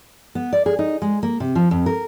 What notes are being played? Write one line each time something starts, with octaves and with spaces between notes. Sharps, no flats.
B3
D5
G#4
D#4
G#3
A#3
C3
F3
F2
A#4